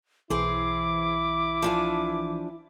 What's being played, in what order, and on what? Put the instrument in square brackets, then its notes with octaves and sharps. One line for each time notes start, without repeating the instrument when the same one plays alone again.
[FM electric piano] B1 E3 [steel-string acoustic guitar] C4 G#4 [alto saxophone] E4 [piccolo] D6
[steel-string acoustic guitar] F3 D4 G#5